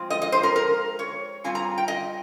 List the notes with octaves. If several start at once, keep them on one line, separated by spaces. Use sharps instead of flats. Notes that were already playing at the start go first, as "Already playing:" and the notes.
Already playing: F3 G#3 C4 F4
D#5
D#5
C5
A#4
A#4
C#5
G3 C4 F4 G#5
A#5
G5
D#5